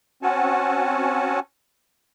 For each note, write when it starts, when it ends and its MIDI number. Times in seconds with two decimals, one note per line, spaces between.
0.23 1.40 60
0.23 1.40 61
0.23 1.40 66
0.23 1.40 78
0.23 1.40 80
0.23 1.40 81